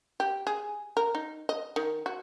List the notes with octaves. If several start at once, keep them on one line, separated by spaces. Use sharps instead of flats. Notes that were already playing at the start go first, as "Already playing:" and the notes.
G4
G#4
A#4
D#4
D#5
D#3
F#4